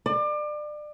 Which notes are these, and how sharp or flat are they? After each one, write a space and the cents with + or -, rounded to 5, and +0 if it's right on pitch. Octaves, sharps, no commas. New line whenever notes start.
D5 +30